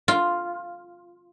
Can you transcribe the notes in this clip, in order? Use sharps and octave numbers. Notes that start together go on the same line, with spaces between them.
F4